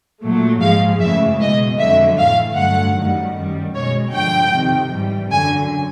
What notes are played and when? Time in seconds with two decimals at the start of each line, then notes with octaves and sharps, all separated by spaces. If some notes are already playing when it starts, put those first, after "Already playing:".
0.23 A#2 F#3 A3
0.61 G#2 F3 G#3 F5
1.01 F#2 C#3 E3 A3 E5
1.40 B2 G#3 D#5
1.79 F2 D3 F#3 E5
2.18 A2 E3 A3 F5
2.57 G2 D3 F#3 A3 F#5
2.96 F#2 D#3 G3
3.35 F#2 D#3 G3
3.74 B2 G#3 C#5
4.14 G2 D3 F3 G5
4.53 F2 C3 D#3
4.92 G#2 E3 G3
5.31 F#2 D3 F#3 G#5